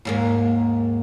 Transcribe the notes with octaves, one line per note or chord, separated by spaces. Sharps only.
D#2 G#2 A#3